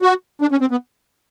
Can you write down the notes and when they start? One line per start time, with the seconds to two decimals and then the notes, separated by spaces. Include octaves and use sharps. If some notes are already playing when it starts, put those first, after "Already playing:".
0.02 F#4
0.42 D4
0.52 C#4
0.61 C4
0.71 B3